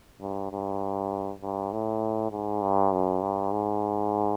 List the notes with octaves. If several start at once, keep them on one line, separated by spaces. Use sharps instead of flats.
G2
G2
G2
A2
G#2
G2
F#2
G2
G#2